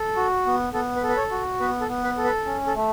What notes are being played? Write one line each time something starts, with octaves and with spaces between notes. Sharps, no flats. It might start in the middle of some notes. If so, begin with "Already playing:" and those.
Already playing: A4
F#4
B3
B3 A4
B4
A4
B4
C#5
F#4
B3 B4
A4
B3
B4
A4
B4
C#4
A4
A3